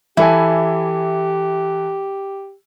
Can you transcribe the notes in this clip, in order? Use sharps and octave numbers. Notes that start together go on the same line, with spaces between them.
E3 E4 G4 A4 G#5